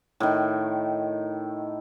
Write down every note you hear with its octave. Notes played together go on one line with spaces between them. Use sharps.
A2 D#3